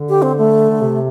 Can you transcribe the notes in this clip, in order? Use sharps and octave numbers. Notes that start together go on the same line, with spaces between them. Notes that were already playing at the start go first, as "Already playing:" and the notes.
Already playing: D3
G4
C4
A3
D3
C3